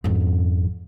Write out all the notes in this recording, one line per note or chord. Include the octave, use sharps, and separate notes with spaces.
G#1 F2